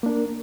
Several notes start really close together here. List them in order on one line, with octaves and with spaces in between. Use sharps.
A#3 D4 A#4